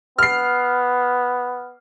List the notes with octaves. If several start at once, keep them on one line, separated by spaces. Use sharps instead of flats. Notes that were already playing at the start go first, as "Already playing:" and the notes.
B3 F6 C7